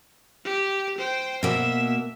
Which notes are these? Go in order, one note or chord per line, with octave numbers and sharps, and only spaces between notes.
G4
C5 G5
B2 A#3 E5